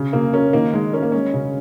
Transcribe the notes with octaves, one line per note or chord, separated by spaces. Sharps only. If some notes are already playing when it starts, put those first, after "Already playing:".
Already playing: C#3 C#4
C#3 A#3
C#4 A#4
D#3 A#3
D#3 G#3
C#4 A#4
A#3
G#3 C#4
C#3